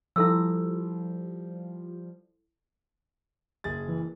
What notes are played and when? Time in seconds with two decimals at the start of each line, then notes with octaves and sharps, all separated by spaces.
0.16 F3 G3 E4 A4 E6
3.64 F#1 G#4 A6
3.88 E3